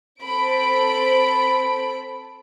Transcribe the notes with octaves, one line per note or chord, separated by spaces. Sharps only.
C4 A4 C5 B5 D7